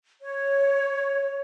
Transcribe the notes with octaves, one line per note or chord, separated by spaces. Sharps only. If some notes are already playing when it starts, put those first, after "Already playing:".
C#5